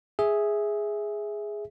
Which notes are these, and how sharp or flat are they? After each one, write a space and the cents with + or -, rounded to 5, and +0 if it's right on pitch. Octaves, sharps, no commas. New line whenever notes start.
G#4 +0 E5 -5